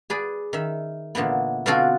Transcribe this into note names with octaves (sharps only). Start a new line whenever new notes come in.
G#4 B4 D5
D#3 E5
A#2 D3 E3 B3
B2 D3 C4 F4 F#4 A4